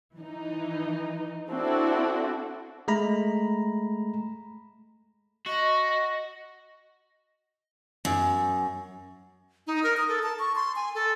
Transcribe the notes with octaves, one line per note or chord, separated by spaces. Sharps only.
E3 D#4
C4 D4 E4 F#4 A4
G#3 A3 A#5 B5
F#4 D#5
F#2
D#4
A#4
D#6
A4
A5
C#6
C6
G#5
A4